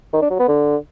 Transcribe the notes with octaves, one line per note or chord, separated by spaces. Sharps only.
D#3
D4
F#3
B3
D3